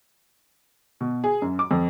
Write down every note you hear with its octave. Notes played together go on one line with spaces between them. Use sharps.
B2
G#4
F#2
D6
F2